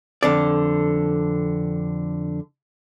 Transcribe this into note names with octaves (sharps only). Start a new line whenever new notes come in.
F2 D3 D5